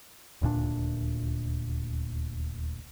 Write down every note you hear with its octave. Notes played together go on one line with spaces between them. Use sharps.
D#1 D2 A#2 D4